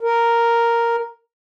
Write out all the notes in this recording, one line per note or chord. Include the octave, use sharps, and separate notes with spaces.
A#4